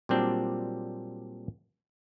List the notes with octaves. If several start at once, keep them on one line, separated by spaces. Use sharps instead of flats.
A#2 F#3 G3 C4 D4